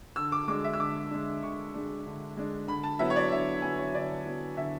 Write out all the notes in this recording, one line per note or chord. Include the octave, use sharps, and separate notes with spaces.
D3 E6
D6
G#3 D4 D6
E5
E6
D3 D6
G#3 D4
D3 C#6
G#3 D4
D3
G#3 D4
D3 B5
A5
F#3 B3 E4 E5
C#5
D5
D3 E5
F#3 B3 E4 G#5
C#5
D3 D5
F#3 B3 E4
D3 E5